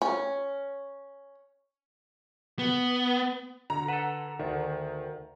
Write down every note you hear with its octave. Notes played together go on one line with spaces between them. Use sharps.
C#4
B3
D3 A#5
A4 B4 F#5 E7
D2 D#3